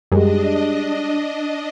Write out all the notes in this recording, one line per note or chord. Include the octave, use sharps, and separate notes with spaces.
F#2 G3 G#3 D4 D#5